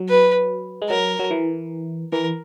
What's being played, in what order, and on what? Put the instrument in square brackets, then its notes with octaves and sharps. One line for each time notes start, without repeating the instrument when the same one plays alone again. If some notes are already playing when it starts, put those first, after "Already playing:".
Already playing: [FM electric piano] F#3
[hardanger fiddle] B4
[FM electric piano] G#3
[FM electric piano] F#3 [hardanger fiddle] A#4
[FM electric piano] F#3
E3
[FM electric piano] E3 [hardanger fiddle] A#4